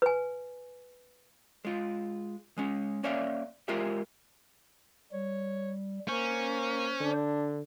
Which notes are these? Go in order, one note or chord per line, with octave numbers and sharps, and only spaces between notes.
B4 G#5
G#3 F4
G#3 C#4
A#3 C#4 C#5 D5 E5 F5
G#3 F4 G4 G#4 A#4 E5
G3 C#5
A#3 C#4 C5
D3 D4